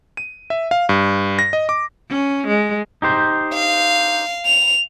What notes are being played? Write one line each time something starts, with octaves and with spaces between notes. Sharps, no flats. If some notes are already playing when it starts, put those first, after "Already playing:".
D#7
E5
F5
G2
A#6
D#5
D6
C#4
G#3
D#4 G4 C5
F5
F7